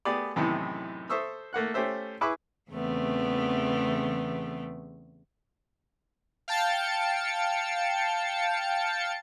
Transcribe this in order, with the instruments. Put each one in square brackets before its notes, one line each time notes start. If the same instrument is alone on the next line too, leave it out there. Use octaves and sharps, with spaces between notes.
[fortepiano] A3 B3 G4 G#4 D5
F#2 A2 C3 D#3 E3 B3
A4 C5 E5 C#6 D#6 E6
A3 A#3 F#5 F#6
A3 C#4 G4 C5 E5
E4 G#4 B4 E5 C#6 D6
[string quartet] E2 C#3 E3 A3 B3 C4
[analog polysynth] F5 G5 A5 A6 C#7